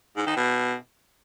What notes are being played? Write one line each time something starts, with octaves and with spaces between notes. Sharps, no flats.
G#2
D#3
B2